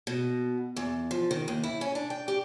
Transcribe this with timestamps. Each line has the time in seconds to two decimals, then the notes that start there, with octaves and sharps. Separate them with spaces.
0.07 B2
0.76 E2
1.11 F3
1.31 D#3
1.48 D#2
1.64 E4
1.81 C#4
1.95 D4
2.10 G5
2.28 G4